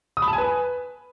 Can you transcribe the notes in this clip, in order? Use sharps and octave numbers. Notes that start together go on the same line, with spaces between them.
D#6
B5
A5
G#5
B4